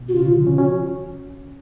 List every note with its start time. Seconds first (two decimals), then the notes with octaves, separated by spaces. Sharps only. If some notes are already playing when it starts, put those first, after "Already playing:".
Already playing: B2
0.08 F#4
0.15 C#3 F4
0.26 D3
0.36 F3
0.47 C#4
0.58 C#4 F#4